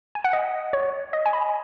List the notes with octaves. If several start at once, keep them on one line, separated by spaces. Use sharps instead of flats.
G#5
F#5
D#5
C#5
D#5
G#5
B5